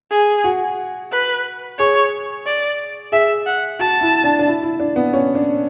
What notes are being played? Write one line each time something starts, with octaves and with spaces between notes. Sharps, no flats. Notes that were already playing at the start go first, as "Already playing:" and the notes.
G#4
F#4
B4
G#4 C#5
D5
G#4 E5
F#5
F#4 A5
E4
D4
D4
E4
E4
D4
B3
C#4
D4